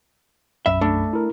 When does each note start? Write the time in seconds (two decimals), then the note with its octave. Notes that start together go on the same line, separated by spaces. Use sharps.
0.66 B1 F#2 E5 B5
0.81 A3 D4
1.13 E4 A#4